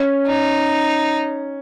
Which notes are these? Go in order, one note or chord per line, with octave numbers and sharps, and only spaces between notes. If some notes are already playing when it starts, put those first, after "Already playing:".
Already playing: C#4
D#4